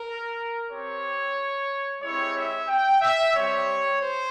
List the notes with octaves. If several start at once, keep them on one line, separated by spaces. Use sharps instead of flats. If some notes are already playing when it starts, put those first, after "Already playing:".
Already playing: A#4
C4 G4 C#5
G#3 C4 E4 G4 C#5
E5
G5
E5
G3 C4 G4 C#5
C5